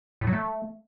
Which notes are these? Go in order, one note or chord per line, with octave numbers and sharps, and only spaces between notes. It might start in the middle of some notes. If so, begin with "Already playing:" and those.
A2
F#3
A3